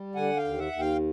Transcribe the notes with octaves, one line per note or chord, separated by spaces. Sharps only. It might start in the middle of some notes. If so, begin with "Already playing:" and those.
Already playing: G3
D3 F#5 G#5
F5 G5
D#2
E5 F#5
D#2
F5 G5